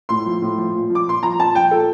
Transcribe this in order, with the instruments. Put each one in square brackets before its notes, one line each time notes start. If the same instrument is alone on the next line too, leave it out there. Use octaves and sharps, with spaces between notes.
[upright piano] A2 C6
F3
A2
F3
A#2
F3
D6
A#2 C6
F3 A#5
A#2 A5
F3 G5
A#2 A4